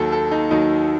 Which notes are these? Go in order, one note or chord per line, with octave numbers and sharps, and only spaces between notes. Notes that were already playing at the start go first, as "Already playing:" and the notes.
Already playing: D#2 D#3 F#3 A4
A4
D#4
D#2 D#3 F#3 D#4